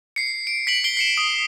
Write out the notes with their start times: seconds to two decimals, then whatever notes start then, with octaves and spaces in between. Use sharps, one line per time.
0.16 C7 C#7
0.47 D7
0.67 B6 D7 F#7
0.84 C7 D7 G7
0.97 C7 C#7 E7
1.17 D#6